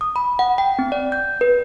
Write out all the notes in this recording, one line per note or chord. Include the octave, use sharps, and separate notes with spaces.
D#6
B5
F#5
G5
C4
D5
G6
B4